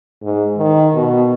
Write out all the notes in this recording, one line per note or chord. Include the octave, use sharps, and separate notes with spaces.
G#2
D#3
B2